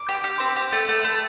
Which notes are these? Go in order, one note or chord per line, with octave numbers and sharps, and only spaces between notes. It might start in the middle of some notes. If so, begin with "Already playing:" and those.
Already playing: D6
G4
G4
C4
G4
A3
A3
A3